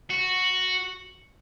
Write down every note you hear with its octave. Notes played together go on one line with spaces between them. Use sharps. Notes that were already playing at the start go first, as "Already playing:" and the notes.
F#4